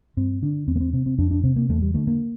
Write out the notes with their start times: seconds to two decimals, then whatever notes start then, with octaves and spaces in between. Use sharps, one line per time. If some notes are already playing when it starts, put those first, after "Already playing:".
0.17 G2 C4
0.42 D3 D4
0.67 E2 C4
0.76 A#3
0.80 C4
0.93 C3 C4
1.06 C4
1.18 F2 D4
1.31 D4
1.44 C3 C4
1.56 A#3
1.69 E2 A3
1.82 G3
1.94 D3 A3
2.07 A#3